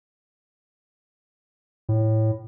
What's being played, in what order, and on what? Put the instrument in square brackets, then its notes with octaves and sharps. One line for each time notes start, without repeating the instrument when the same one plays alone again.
[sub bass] A2